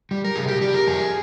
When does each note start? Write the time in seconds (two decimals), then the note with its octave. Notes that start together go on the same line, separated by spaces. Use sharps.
0.11 G3
0.25 A#4
0.36 C3 G#4
0.48 G4
0.61 G3 G4
0.74 A#4
0.87 F2 G#4